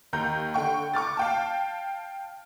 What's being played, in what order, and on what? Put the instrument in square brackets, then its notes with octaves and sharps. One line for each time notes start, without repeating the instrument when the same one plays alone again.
[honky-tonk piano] D#2 A#5 G6
D3 G5 C#6
C#6 D6 F6 A6
F5 G5 A5